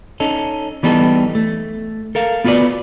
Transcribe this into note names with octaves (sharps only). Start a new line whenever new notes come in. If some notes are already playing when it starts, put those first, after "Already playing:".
C#4 D#4 A4
E3 G3 B3 D#4 G4 A4
A3
A4 A#4 F5
B3 F4 F#4 B4 D5